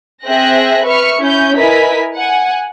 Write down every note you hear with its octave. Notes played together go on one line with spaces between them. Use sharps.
C4 G#4 E5 G5 F#6 A#6
B4 E5 C#6 F6 C#7
C#4 E4 G6
E4 A#4 B4 D#5 G#5 B6
F#5 G#5